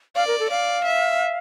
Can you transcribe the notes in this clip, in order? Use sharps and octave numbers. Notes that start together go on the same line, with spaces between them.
D5 F5
A#4
A4
D5 F5
E5